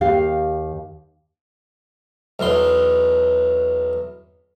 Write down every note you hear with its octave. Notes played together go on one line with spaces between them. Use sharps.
D#2 G4 F5
B1 E2 E3 C6